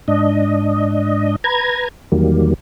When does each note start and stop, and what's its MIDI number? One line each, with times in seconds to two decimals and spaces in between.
0.08 1.36 44
0.08 1.36 62
0.08 1.36 75
1.44 1.88 71
1.44 1.88 82
1.44 1.88 92
2.12 2.54 40
2.12 2.54 51
2.12 2.54 54
2.12 2.54 55
2.12 2.54 58